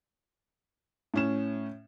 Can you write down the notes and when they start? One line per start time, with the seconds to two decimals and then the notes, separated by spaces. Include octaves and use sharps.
1.14 A2 C#4 E7